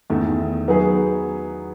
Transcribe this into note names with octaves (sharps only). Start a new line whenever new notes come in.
E2 D#3 A3
F#3 B3 D#4 G#4 B4